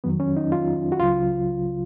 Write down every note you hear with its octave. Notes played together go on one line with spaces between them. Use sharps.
F2 D#3 F#3 B3
C#4
D#4
F4
F#4
C#2 C#3 F#3 F4